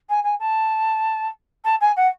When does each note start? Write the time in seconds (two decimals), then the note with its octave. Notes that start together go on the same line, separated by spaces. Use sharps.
0.09 G#5
0.24 G#5
0.40 A5
1.64 A5
1.81 G#5
1.97 F#5